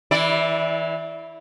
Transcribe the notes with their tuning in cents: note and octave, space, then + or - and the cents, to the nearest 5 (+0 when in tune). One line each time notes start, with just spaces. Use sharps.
E3 -25 E4 +0 D5 -5